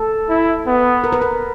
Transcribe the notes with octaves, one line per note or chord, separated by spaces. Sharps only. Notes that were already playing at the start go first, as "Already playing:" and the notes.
Already playing: A4
E4
B3
A#4
B4
A#4